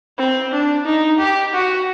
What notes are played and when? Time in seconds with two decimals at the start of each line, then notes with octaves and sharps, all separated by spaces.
0.18 C4
0.52 D4
0.85 D#4
1.19 G4
1.54 F#4